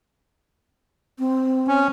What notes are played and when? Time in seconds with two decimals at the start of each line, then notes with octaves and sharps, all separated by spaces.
1.19 C4
1.68 C#4